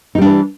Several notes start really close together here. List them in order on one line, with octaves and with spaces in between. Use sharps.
D#4 G3 D4 E3